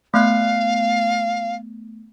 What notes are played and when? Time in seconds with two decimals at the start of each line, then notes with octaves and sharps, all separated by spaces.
0.14 A3 B3 F5 F#6